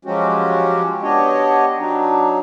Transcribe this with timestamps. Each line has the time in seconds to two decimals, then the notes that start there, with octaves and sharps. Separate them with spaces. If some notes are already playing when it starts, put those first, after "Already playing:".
0.05 F3 F#3 G#3 C#4 F#4 G4
1.03 B3 D4 G4 C#5 D#5
1.78 F#3 D4 D#4